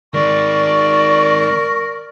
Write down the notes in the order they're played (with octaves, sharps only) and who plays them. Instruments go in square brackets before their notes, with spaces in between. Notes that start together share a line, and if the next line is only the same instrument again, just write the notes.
[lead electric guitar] D#3 G#3 [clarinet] A#4 [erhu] D5 [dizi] C#6